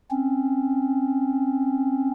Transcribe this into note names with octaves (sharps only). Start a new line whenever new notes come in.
C4 C#4